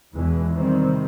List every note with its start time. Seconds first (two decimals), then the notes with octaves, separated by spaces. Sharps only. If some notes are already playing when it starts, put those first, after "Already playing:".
0.14 E2 B2 E3 G#3
0.53 C3 D#3 G3 C4